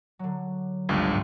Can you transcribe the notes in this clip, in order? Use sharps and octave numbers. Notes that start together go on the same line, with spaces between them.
D3 F#3
G1 C#2 G2
F2 G#2 C3